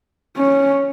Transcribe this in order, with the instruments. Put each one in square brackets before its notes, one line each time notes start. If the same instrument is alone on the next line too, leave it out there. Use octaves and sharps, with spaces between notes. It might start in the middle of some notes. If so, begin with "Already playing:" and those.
[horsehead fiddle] C#4